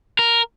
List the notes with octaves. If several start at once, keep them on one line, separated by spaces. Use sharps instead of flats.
A#4